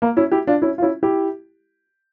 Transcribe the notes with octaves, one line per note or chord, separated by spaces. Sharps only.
A#3
C#4 E4
E4 G4
D4 F4
C#4 E4
F4
C#4 E4
E4 G4